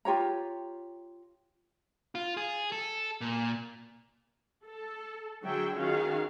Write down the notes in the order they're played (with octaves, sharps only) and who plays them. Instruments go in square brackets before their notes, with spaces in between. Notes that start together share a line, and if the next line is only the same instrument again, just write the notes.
[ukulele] F4 G4 C#5 A#5
[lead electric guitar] F4
G#4
A4
A#2
[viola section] A4
D3 F#3 G#4 E5 G5
D#3 C#4 F4 F#4 G#4 F5